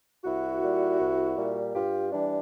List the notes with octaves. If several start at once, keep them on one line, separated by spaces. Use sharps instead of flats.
C2 E4 F#4
A#2 G3
C2
A#2 G3
G2 F4 G4
E3 G3 D4